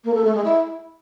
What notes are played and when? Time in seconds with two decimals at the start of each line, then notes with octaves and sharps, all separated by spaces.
0.04 A#3
0.14 A4
0.24 A3
0.34 G#3
0.44 E4